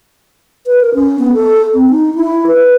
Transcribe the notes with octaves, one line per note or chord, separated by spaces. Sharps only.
B4
A#4
C#4
B3
A4
C4
D#4
E4
B4